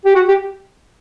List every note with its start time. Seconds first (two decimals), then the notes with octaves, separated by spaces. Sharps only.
0.05 G4
0.15 F#4
0.29 G4